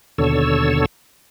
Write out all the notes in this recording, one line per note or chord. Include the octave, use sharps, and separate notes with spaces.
D#2 B2 D3 A4 C#5 E6